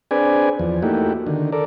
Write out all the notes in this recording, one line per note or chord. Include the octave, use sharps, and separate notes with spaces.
C4 D4 G#4 B4 D5 G#5
E2 F3
A3 A#3 D#4 E4 F#4 G4
D3 D#3
A4 A#4 D5